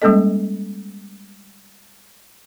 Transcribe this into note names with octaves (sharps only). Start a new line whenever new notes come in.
G3 G#3 A#3 C#4 A4 D#5